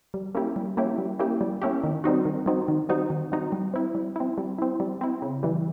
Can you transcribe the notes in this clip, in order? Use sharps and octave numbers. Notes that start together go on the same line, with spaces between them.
G3
A#3 C#4 E4 G4
G3
A#3 C#4 E4 G4
G3
A#3 C#4 E4 G4
G3
A#3 C#4 E4 G4
D#3
G3 C4 D#4 F#4
D#3
G3 C4 D#4 F#4
D#3
G3 C4 D#4 F#4
D#3
G3 C4 D#4 F#4
G3
C4 E4
G3
C4 E4
G3
C4 E4
G3
C4 E4
C#3
E3 G3